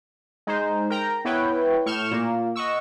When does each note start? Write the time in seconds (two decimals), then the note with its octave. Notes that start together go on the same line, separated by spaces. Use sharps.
0.47 G#3 D#4 C5
0.90 A#4 G5 A#5
1.25 B3 E4 B4 C#5 G5
1.86 A2 C#6 F6 G6 E7
2.11 A#2 A#3
2.56 D#5 F#5 C#6 E6